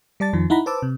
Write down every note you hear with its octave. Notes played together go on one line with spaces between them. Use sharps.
G3 D5 A5 A6
F2 D#3 F3
D#4 E4 F#5 A#5 B5
B4 C5 A5 D6 E6
C3